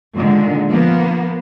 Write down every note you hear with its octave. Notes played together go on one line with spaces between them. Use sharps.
A#2 D3 D#3 G#3
F3 A#3 B3